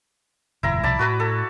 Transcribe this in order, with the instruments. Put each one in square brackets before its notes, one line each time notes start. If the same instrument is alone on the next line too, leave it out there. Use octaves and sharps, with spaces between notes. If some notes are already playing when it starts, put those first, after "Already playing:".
[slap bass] F#1 E2 A#2 [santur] E4 A#5
[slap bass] C2 B2 F3 [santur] D5 A5 B5
[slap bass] A2 [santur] F#4 B4 A#5
[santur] A4